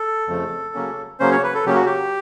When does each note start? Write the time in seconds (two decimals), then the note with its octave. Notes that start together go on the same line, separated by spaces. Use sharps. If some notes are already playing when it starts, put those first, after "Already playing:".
Already playing: A4
0.28 F2 C#3 F3 A3
0.75 C#3 F#3 A#3 C#4
1.19 C#3 F#3 A#3 C#4 C5
1.32 C#5
1.44 B4
1.55 A4
1.66 C#3 F#3 A#3 C#4 G4
1.76 F#4
1.86 G4